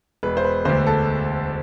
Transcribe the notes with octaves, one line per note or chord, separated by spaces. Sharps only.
E1 B4
C5
B4
D2 D3 C5
A4